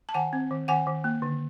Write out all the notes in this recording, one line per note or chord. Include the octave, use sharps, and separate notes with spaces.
A5
D#3 F#5 G#5
C4
D#3
D#3 F#5 G#5
D#3
A#3
D3